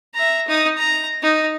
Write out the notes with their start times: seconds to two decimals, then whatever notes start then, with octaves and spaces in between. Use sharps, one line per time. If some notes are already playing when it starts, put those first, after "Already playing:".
0.14 E5 A#5
0.47 D#4 D#6
0.76 A#5
1.22 D#4